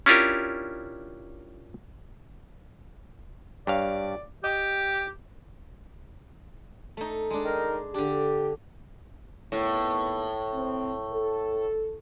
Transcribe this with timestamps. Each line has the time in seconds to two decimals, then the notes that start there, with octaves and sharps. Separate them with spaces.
0.06 C#4 D4 E4 F4 G4 A#4
3.67 G2 C#5 D5 F5
4.44 G4 D#5 G5
6.97 A3 D#4
7.30 G#3 D4
7.44 D#3 D#4 A#4
7.94 D3 D4 G4
9.52 D#2 A2 B3
10.53 C4
11.12 A4